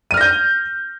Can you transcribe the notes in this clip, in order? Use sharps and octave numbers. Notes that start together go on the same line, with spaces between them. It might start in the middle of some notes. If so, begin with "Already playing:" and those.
F6 G6 A#6 D#7